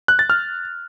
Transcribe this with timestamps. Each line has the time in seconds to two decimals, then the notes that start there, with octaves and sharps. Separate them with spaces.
0.08 F#6
0.19 A6
0.30 F6